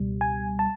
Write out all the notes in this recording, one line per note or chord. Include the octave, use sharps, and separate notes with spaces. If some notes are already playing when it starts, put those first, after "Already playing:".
Already playing: C#2 B2 G3
G#5
A5